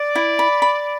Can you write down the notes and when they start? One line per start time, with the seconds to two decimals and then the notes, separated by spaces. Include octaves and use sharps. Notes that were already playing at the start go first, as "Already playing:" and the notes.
Already playing: D5
0.15 E4
0.39 B5
0.62 B5